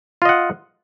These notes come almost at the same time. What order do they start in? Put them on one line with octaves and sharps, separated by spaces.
F4 D#5 F#5